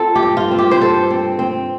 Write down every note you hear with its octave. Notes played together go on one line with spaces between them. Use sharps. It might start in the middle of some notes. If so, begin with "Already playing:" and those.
Already playing: C4 F4 A4
G4
G2
F4
C4
G4
C5
G2 A4
C4
C4